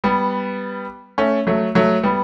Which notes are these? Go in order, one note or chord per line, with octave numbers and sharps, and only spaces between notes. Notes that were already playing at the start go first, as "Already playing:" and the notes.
G3 B3
A3 C#4
F#3 A3
F#3 A3
G3 B3